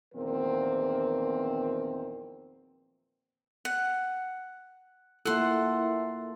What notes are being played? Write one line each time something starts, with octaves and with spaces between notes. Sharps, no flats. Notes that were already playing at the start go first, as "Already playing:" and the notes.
E2 A#2 D#3 F3 C4 A#4
F#5
A#3 E4 F4 A4 E5 F#5 C6